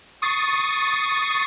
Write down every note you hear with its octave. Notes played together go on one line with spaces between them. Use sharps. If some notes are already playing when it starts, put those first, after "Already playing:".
C#6 D#6 A6 C7